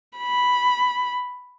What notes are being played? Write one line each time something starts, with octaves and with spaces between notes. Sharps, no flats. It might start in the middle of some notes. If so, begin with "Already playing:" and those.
B5